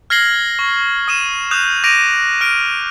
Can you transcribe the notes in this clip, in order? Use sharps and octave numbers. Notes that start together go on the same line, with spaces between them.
F6 G#6 A#6 C7 F#7 G7
C#6
D#6 D#7 E7
D#6 F#6 G6 E7 F7
D6 A#6 D7 D#7 F7
F6 D7